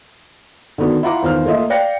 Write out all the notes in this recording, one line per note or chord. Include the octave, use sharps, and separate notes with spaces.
D3 D#3 B3 F#4
E4 F4 F#5 A#5 D6
E2 D#3 F4 C5 F5 F6
A3 A#3 F4 D#5 E5
D5 F5 G5 F#6 A#6 C#7